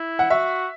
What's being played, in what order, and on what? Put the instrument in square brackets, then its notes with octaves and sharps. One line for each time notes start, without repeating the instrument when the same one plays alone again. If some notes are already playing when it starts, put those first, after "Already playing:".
Already playing: [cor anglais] E4
[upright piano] F#5
[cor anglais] F#4 [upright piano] E5